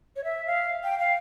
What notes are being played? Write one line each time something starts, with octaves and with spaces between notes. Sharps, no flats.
C#5
E5
F5
G5
F5